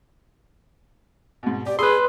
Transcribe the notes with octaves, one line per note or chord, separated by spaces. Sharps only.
G#2 B2
G4 D5
G#4 B4 B5 C6 D#6 E6